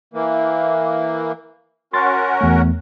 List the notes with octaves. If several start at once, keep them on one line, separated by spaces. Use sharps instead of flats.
E3 A#3
C#4 F#4 A#4 C6 A6
E2 A3